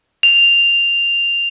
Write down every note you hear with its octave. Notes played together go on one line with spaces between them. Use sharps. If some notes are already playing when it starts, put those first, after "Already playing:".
F7